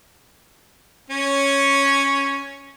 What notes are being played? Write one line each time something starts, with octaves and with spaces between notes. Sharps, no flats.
C#4 C#5